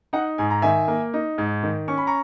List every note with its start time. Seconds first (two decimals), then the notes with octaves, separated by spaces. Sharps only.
0.13 D#4 F#5
0.38 G#2 G#5
0.50 A#5
0.62 D#3 E5 G#5
0.88 A#3
1.14 D#4
1.38 G#2
1.63 D#3
1.88 C#4 C#6
1.98 B5
2.07 A#5 C#6